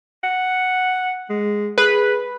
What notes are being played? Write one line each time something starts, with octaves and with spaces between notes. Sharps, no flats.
F#5
G#3
G#4 B4